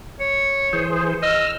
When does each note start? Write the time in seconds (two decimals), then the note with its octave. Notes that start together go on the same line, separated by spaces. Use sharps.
0.20 C#5
0.73 E3 G#4 C5
1.23 D#5 E6 F6